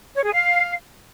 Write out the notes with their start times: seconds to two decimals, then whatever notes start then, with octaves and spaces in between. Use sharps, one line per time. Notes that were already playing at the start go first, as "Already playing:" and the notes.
0.15 C#5
0.24 G#4
0.32 F5